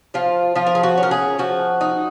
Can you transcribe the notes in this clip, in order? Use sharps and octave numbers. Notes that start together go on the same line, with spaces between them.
F3 F4
F3 F4
A#4
G#4
F#4
C#4
A#4
G#4
F3 F#4
D#4